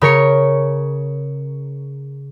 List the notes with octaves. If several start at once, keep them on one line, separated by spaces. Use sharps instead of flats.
C#3 A#4 C#5 C#7